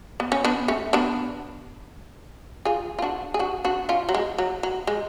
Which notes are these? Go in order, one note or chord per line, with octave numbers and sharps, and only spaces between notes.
B3
C#4
B3 D4
A3 C#4
B3 D4
F4 G#4
F4
D4 F#4
G#4
D4 F#4
D4 F#4
C#4 F4
F#3
G#3
F#3
F#3
G#3